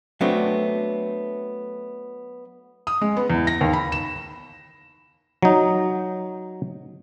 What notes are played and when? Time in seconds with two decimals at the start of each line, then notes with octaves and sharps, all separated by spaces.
0.21 F#3 A3 B3 C4 D4
2.87 D#6
3.01 G#3
3.17 B3
3.30 E2
3.47 A#6
3.61 D#2
3.73 B5
3.92 E7
5.42 F#3 D#4